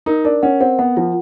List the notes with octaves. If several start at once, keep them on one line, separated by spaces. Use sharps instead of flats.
D#4 A#4
D4 A#4
C#4 F#5
C4 F#5
B3 F#5
F3 F4